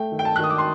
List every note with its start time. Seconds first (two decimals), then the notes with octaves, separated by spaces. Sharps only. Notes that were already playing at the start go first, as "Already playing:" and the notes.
Already playing: A3 G5
0.12 D#3
0.19 G5
0.25 A5
0.36 F#6
0.39 D#3 D#6
0.50 D6
0.58 C6